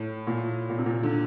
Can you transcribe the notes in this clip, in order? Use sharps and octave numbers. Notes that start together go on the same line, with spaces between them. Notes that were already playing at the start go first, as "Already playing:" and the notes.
Already playing: A2
A#2
A#2
C3
A#2
D3